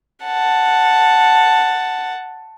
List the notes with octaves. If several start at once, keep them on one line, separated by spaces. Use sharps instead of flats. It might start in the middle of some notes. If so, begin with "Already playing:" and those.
F#5 A5